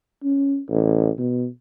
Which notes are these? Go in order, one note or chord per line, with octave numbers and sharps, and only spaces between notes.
C#4
A1
B2